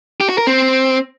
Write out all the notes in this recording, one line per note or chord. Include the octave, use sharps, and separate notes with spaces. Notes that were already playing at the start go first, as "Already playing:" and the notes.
G4
F#4
A#4
C4